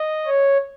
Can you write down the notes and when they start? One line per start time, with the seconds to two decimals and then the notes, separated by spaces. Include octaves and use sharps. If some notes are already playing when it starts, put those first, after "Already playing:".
Already playing: D#5
0.26 C#5